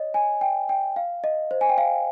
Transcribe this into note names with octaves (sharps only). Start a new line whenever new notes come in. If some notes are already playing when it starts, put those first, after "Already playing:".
Already playing: C#5 D#5
G#5
G5
G5
F5
D#5
C5
G#5
G5
F5